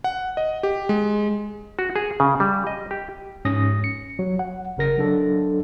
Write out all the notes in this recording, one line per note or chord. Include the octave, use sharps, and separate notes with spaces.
F#5
D#5
G4
G#3
F#4
G#4
C#3
G3
D#5
G4
G#2 C#4 D#6 A#6
C#7
F#3
F#5
G1 C#3 A#4 A#6
F#3 D4 A4